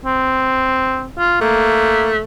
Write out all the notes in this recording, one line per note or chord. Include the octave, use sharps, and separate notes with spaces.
C4
F4
A3 A#3